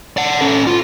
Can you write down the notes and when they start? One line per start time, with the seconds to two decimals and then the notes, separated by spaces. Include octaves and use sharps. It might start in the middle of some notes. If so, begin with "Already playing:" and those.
0.17 D5 F#5
0.41 C#4 A4
0.67 F4